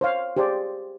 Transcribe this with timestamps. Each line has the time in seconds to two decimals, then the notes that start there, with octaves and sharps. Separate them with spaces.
0.01 C5 C#5 F5
0.36 G4 G#4 C5 D5